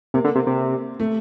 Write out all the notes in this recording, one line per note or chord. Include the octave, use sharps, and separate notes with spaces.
C3 A#3
D3
C3
C3
A3